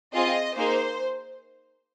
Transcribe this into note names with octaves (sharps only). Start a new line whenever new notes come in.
C4 F4 G#4 D#5
A#3 D#4 G#4 C5